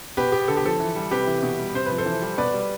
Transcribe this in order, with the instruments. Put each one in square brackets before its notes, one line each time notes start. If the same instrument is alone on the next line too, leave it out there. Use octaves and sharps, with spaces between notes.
[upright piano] B2 G4 B4
B3 G4
D3 A4
G4
F3 A4
E3
G3
C3 G4 B4
E3
B2
G3
C3 C5
F3 B4
A4 C5
E3
G3
B2 B4 D5
G3